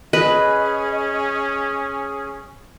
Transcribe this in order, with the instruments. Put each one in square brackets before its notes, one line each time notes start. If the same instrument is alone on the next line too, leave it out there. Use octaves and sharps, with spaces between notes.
[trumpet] C#4 [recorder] G#4 [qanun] B4 [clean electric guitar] D#5